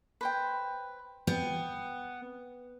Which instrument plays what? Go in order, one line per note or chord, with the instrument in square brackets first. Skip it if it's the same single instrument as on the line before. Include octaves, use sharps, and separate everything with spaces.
[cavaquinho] B4 C5 G5
[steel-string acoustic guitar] B3 [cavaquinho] G5